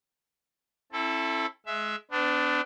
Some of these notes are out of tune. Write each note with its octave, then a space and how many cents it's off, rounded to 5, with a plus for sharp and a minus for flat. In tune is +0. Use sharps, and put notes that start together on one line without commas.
C4 +40 E4 +0 A4 +0
G#3 +30 E5 +10
B3 +40 D4 +0